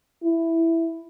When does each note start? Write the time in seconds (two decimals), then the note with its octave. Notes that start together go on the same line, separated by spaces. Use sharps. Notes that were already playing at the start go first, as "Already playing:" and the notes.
0.24 E4